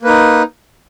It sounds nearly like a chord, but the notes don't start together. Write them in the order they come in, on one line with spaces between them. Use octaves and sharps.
A#3 B4 D#4